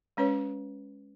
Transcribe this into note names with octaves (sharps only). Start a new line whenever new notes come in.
G#3 C#4 B4 C#5